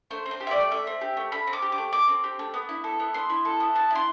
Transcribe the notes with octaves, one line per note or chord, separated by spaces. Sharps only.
A3 C5
C4
C5
G4
E5
A3 D5
A3 E5
C4
G4
A3
A3 B5
C4
D6
G4
D6
A3
A3 D6
C4
G4
A3
B3
E4
A4
B3
B3 C6
E4
A4
B3
B3 A5
E4 C6